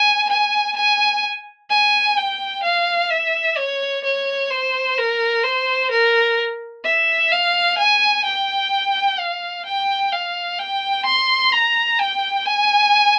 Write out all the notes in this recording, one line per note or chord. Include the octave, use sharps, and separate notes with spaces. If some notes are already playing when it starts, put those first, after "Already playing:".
Already playing: G#5
G#5
G#5
G#5
G5
F5
E5
C#5
C#5
C5
A#4
C5
A#4
E5
F5
G#5
G5
F5
G5
F5
G5
C6
A#5
G5
G#5